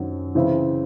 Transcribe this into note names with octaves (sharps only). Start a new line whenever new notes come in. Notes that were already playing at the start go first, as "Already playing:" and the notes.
Already playing: F#2 D#3 F#3 C4
C#3 E3 C4 E4